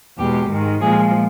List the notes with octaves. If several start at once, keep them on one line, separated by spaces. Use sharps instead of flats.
E2 B2 G#3 G4
G#2 D#3 G#3
A#2 F3 G#3 G#4